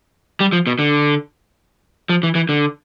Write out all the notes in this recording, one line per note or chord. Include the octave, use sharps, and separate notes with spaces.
G3
F3
B2
D3
F3
E3
E3
D3